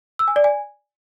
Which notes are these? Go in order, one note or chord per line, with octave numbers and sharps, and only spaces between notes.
E6
G#5
D5
G#5